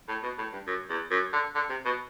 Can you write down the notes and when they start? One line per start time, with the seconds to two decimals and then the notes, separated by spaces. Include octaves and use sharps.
0.08 A2
0.23 B2
0.38 A2
0.53 G2
0.67 F#2
0.90 E2
1.11 F#2
1.33 D3
1.55 D3
1.70 C3
1.85 B2